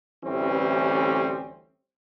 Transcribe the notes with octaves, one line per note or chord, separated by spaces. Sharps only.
A1 D2 E3 G3 C4 C#4